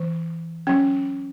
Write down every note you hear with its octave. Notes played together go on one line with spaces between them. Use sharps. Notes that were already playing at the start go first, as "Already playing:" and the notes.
Already playing: E3
F#3 C#4